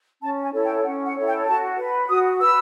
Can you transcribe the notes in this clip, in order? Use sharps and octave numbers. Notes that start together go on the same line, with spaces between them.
C#4 A5
G#5
E4 A4 C#5
G5
C#4 F#5
F#5
E4 A4 C#5
G5
F#4 A5
B4
F#4 D#6
B4 E6